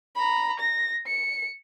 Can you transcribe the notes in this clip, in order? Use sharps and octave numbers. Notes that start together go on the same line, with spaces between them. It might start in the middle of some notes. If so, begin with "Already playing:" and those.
A#5 B5
A#6
C#7